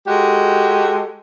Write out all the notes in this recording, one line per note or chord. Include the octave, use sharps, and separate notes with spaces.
G#3 F#4 G4 A4